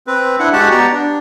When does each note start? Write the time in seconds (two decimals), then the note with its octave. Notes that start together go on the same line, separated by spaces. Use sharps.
0.07 C4 B4
0.39 D4 E4 F#5
0.53 G#3 F#4 G4 F#5 A5
0.71 B3 G4 D5 A#5
0.92 D4